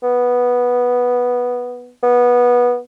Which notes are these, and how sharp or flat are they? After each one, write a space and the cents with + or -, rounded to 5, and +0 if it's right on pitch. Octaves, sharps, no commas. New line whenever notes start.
B3 -5
B3 -15